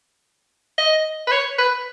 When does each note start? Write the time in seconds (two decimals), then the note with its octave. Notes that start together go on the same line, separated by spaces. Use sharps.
0.78 D#5
1.27 B4
1.31 C#5
1.58 B4